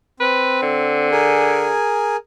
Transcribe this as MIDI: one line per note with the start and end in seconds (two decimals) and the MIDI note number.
0.20 1.09 60
0.20 0.61 71
0.62 1.75 50
1.12 2.17 68
1.12 2.17 70
1.12 2.17 80